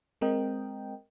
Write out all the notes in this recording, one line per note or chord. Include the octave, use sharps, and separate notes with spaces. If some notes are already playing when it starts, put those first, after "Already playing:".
G#3 C4 A#4 D#5 G5